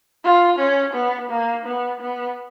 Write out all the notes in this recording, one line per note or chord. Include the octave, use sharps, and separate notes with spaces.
F4
C#4
B3
A#3
B3
B3